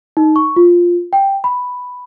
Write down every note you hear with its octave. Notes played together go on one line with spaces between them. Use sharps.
D#4
C#6
F4
G5
B5